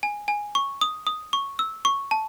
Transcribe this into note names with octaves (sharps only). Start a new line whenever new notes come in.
G#5
G#5
C#6
D#6
D#6
C#6
E6
C#6
A5